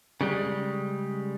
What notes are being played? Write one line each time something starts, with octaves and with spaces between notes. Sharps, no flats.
C#3 G3 G#3